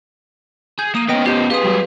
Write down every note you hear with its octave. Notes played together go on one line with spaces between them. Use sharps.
G#4 G6
A#3 D#6 D#7
B3 C#4 D#5 G5 A#6 D7
F4 G4 D#5 G6
G4 G#4 B4 F5 C6 D#6
F#3 G3